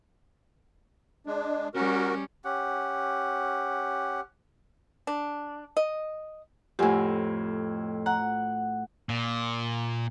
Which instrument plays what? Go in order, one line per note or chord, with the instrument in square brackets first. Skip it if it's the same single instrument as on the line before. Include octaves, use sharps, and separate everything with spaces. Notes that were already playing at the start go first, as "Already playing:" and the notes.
[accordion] G#3 D4
[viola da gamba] G3 C#4 [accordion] F#4 A#4
[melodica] C#4 G4 F#5
[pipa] D4
D#5
[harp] F2 A2 [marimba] G4 F#5 G#5
[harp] F#5 [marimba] A#5
[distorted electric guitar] A#2